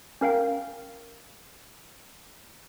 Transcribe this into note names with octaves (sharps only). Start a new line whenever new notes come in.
C#4 A#4 F5 G5